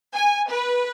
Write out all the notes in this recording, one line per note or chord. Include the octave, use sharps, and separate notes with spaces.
G#5
B4